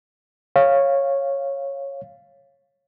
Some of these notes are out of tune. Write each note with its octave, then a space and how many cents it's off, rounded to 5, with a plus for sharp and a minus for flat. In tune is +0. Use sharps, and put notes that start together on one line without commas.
C#5 -10 F5 -5